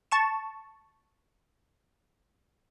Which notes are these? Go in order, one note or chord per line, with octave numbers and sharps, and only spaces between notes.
A5 C#6 E7